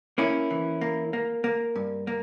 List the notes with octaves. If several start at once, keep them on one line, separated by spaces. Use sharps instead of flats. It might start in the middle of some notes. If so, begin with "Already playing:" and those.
A#3 C#4 E4
E3
A#3
A#3
A#3
G2
A#3